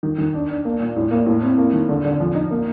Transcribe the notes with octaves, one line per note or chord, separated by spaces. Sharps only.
D#3
D#3
D4
D4
A#3
A#2
A2
A#3
A2
C4
A#3
D#3
D3
D3
F3
D#4
A#3